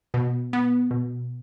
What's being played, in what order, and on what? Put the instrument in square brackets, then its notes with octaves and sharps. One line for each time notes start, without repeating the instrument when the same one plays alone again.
[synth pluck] B2
B3
B2